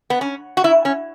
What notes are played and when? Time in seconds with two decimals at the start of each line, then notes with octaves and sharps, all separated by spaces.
0.10 B3
0.21 C#4
0.57 F#4
0.64 E4
0.85 C#4